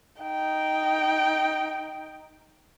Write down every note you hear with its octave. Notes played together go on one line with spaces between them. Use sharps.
D#4 G5